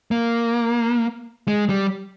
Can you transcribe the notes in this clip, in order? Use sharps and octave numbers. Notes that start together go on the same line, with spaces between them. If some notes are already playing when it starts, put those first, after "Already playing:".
A#3
G#3
G3